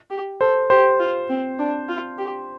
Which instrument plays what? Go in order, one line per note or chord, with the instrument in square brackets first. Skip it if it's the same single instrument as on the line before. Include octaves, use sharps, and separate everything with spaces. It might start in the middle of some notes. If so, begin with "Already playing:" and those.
[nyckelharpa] G4
[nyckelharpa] A4 [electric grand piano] C5
[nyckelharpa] G4 [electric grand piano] C5
[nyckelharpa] F4
C4
D4
F4
G4